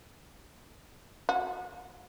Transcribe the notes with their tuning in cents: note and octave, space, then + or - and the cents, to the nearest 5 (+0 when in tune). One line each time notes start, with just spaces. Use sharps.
F#4 -15